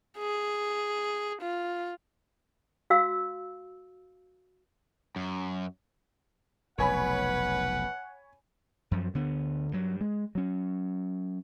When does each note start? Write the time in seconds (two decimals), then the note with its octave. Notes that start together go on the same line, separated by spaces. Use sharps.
0.18 G#4
1.42 F4
2.90 F#4 F5 E6
5.16 F#2
6.78 F1 B1 B4 C#5 F#5 G#5 B5
8.91 F#2 F3
9.14 D2 D3 B3
9.72 G2 F#3
10.01 G#3
10.35 F#3 C#4